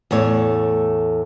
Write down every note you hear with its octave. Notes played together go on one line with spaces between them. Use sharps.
E2 A2 A3 C#5